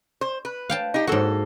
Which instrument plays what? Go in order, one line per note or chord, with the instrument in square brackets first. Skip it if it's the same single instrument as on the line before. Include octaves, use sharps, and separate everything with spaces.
[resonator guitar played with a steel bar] C5
B4
[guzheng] F5 G5 A5
[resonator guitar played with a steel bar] D#4 G4
[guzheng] G#2 F#4 [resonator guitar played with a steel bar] A#3 A4